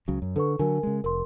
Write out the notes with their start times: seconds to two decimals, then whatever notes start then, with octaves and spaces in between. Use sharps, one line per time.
0.08 C#2 C#3 F#3
0.22 F#2
0.36 D3 A4 B4 C#6
0.59 D3 F#3 A#4 G#5
0.83 C#3 G#3
1.04 F1 A#4 C6